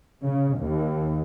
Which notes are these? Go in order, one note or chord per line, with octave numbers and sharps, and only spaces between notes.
C#3
D#2